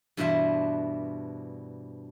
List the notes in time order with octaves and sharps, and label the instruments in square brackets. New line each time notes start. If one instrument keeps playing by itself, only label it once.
[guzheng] G2 B2 E3 D4 C5 E5